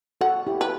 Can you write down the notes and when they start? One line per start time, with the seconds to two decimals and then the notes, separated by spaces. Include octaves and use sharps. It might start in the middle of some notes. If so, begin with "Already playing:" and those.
0.21 F#4 A4 F#5
0.47 E4 G4
0.61 B4